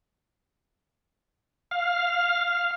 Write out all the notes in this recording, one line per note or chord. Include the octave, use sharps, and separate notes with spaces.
F5